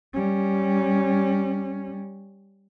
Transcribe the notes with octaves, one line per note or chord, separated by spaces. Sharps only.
G3 C#4